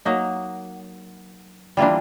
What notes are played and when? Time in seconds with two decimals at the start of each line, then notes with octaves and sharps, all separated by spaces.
0.05 F#3 A#3 D#4
1.77 E3 G3 A#3 D4 F4